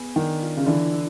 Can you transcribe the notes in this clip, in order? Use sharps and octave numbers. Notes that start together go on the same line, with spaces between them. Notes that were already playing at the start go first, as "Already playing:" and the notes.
Already playing: B3 G#4
D#3 D4
F4
C#3
D3 E3
E4